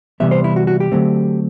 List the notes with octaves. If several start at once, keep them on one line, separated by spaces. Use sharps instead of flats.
C3 E3 G3 B3 E5
C5
E4
F#4
F#4
G4
D3 F#3 A3 C4